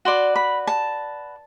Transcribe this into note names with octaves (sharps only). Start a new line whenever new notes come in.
F#4 B4 D5 C6
B5
A5